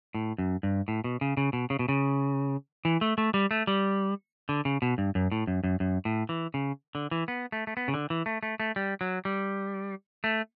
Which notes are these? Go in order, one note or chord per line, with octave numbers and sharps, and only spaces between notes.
A2
F#2
G2
A2
B2
C#3
C#3
B2
C#3
B2
C#3
E3
A3
A3
G3
A3
G3
D3
C#3
B2
G2
F#2
A2
F#2
F#2
F#2
A2
E3
C#3
D3
E3
B3
A3
A3
B3
C#3
D3
E3
A3
A3
A3
G3
F#3
G3
A3